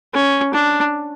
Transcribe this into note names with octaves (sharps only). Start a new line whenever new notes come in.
C#4
D4